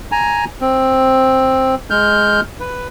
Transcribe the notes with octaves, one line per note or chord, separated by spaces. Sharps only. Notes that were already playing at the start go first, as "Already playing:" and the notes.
G#5 A#5
C4
G#3 F6 G6
B4